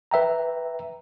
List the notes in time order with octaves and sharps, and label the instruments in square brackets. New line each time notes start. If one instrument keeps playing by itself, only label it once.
[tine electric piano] B4 E5 G5 A#5